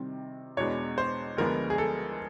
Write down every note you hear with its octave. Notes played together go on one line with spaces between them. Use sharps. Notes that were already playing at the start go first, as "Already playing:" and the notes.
Already playing: C3 D#3 G3 C4
E2 B2 G#3 B3 D4 C#5
C5
D2 D3 F3 G#3 B3 A#4
G#4
A4